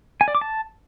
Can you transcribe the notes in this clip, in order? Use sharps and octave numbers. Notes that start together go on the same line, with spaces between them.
G#5
D5
D6
A5